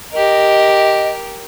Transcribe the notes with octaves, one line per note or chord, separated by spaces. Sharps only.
G4 A#4 D#5